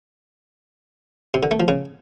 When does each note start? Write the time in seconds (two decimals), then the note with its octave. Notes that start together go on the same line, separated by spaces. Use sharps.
1.34 C3
1.43 D3
1.51 A3
1.60 F3
1.68 C#3